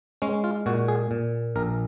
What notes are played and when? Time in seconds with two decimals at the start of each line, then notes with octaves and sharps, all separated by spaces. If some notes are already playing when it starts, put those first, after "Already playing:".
0.22 G#3 C#4
0.44 F4
0.66 A#2 F#4
0.88 G#4
1.11 A#2
1.56 A#1 A#4